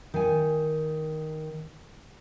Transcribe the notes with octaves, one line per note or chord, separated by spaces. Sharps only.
D#3 G#5